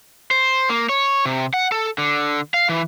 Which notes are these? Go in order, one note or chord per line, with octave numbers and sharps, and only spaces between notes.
C5
A#3
C#5
C3
F#5
A4
D3
F5
E3